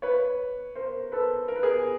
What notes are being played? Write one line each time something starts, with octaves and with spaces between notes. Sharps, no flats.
B4 C#5
A#4 C5
A4 B4
A#4
B4
G#4 A#4